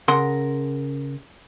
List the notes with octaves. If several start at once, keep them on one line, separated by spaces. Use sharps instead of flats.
C#3 A#4 F#5 C6